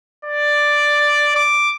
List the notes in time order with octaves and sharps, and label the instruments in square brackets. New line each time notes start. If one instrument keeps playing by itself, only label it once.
[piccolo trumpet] D5
D6